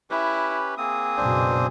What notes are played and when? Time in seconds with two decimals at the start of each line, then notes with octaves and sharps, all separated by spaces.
0.10 C#4 E4 G4 B4
0.78 A#3 C4 G#4 D#6
1.17 F#1 B2 D4 C5